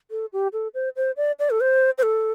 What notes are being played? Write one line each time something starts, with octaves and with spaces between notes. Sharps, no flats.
A4
G4
A4
C5
C5
D5
D5
A4
C5
C5
A4